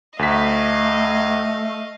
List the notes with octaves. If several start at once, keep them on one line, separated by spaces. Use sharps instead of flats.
D2 A3 D#5 F5 B6